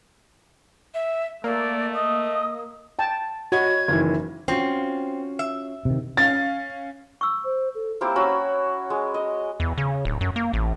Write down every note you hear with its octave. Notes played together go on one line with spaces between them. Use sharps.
E5
A3 A#3 D5
D#5 D#6
G5 A5
F#4 C#5 D#5 B5 G#6
F#1 D#3 E3
C4 C#4 F4 F#4
E5
C3 D#3
C#4 F5 A6
C#6 E6
C5
A4
A#3 C4 E4 G4
C#4 F#4 B5 E6
G#3
D#5
E2
C#3
D1
F#2
A#3
A1